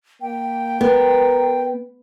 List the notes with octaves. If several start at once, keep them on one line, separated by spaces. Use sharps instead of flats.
A#3 G5
B3 A#4